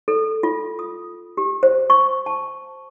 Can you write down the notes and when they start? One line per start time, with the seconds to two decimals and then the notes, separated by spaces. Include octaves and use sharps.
0.08 A4
0.43 F4
0.79 D#6
1.37 G4
1.63 C5
1.90 C#6
2.26 A5